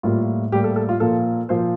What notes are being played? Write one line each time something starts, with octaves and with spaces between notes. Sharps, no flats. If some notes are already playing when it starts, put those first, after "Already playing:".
A2 G3 A#3 F4
A2 G3 A#3 G4
A4
A4
F4
A#2 F3 A#3 A4
A#2 F3 A#3 C5